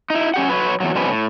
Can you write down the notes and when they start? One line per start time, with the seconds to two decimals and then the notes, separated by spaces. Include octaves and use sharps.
0.10 D#4 E4
0.34 C#4 G4 F#5
0.48 F#3 B4 C#5
0.80 E2 G2 F#3
0.95 B2 F3 G3 C4 C#4 B4
1.09 A2